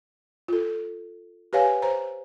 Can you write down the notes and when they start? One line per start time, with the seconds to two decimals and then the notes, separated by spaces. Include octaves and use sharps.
0.48 F4 A4
1.53 G4 B4 C#5 F5 G#5
1.82 C5 A#5